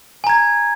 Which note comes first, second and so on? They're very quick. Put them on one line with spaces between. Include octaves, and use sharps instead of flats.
G#5 A#5 G#6